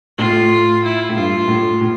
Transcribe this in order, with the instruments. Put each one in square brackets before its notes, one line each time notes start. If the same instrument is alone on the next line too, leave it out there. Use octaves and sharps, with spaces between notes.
[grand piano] A2 [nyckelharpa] F4
[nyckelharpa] E4
[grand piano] A2
[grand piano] G2 [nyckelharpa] F4
[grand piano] A2
A2